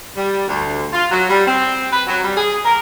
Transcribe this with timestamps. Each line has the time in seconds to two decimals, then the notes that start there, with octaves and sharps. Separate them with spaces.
0.16 G3
0.47 D2
0.93 F4
1.11 F#3
1.29 G3
1.47 C4
1.92 B4
2.06 F#3
2.24 G3
2.37 G#4
2.65 A#4